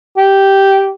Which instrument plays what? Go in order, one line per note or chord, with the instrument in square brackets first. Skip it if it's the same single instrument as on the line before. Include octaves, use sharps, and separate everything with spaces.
[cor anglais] G4